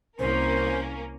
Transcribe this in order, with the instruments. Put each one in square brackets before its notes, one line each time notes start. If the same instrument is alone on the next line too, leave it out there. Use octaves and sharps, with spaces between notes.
[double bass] C2 [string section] A#3 C#4 A#4 [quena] C5